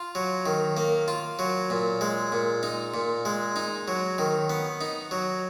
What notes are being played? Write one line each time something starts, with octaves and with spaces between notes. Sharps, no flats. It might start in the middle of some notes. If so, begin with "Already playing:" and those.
Already playing: F4
F#3
D#3
A#3
F4
F#3
A#2
G#3
A#2
D#4
A#2
G#3
D#4
F#3
D#3
B3
D#4
F#3